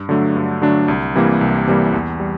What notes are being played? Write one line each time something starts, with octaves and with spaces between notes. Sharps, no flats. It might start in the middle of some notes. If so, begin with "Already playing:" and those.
Already playing: G2
D3 F#3 A3 D4
G2
D3 F#3 A3 D4
C2
C3 E3 G3 A#3
C2
C3 E3 G3 A#3
E2
G3